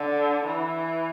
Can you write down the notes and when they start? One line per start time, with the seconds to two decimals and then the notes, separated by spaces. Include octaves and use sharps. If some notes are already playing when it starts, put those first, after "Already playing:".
Already playing: D3
0.46 E3